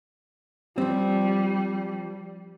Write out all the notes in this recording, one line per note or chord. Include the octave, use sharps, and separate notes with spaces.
F3 G3 C4